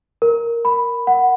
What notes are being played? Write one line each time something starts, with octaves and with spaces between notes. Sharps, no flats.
A#4
B5
F#5